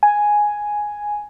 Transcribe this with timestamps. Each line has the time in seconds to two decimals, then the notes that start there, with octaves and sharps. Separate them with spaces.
0.03 G#5